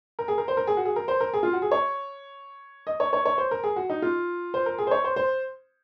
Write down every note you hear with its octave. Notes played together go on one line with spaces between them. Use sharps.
A#4
G#4
A#4
C5
A#4
G#4
F#4
G#4
A#4
C5
A#4
G#4
F4
F#4
G#4
C#5
D#5
C#5
C#5
C#5
C5
A#4
G#4
F#4
D#4
F4
C5
A#4
G#4
C5
C#5
C5
C5